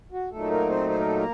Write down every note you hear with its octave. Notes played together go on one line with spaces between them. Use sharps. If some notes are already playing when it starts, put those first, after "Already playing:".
F#4
A#2 F#3 A3 D#4 A4
A#3 A#4
C4 C5
C5
A#4
A4
A#3 A#4